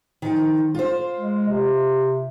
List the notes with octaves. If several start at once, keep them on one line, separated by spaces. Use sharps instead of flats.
D#3 F3
F4 C5
G#3
C3